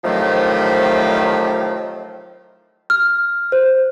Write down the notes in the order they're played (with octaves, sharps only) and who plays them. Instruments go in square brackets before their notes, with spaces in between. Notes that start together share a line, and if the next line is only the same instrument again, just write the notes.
[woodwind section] A2 C3 D#3 F3 F#3 A3
[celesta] F6
C5